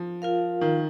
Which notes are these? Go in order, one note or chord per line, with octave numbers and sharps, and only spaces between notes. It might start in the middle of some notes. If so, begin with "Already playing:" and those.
Already playing: F3
F4 A#4 F5
D#3